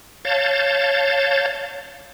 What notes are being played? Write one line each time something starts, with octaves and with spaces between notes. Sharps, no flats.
C#5 F5 A5 G6 A6